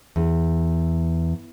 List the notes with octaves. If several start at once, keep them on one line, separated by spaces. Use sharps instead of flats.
E2